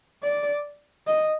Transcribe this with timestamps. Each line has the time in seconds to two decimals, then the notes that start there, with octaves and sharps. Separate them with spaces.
0.23 D5
1.07 D#5